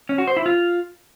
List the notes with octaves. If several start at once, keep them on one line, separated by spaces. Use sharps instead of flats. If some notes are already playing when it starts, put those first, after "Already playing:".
C#4
F#4
C5
E4
F4